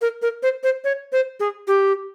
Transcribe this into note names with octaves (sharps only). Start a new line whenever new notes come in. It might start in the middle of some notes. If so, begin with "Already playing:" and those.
A#4
A#4
C5
C5
C#5
C5
G#4
G4